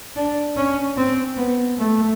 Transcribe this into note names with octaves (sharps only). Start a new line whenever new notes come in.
D4
C#4
C4
B3
A3